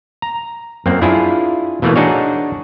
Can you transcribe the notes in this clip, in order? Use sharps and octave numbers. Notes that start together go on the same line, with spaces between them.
A#5
F#2 A#3 C4
D4 E4 F4 G#4
B2 E3 A3 A#3
D4 D#4 F#4 G#4 C#5